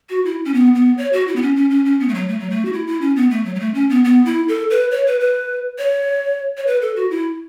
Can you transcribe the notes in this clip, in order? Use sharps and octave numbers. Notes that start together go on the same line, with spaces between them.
F#4
E4
C#4
B3
B3
C#5
F#4
E4
B3
C#4
C#4
C#4
C#4
B3
A3
F#3
A3
F#3
A3
F#4
E4
E4
C#4
B3
A3
F#3
F#3
A3
C#4
B3
B3
E4
A4
B4
C#5
B4
B4
C#5
C#5
B4
A4
F#4
E4